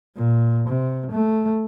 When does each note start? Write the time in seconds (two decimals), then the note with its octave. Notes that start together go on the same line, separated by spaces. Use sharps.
0.17 A#2
0.67 C3
1.11 A3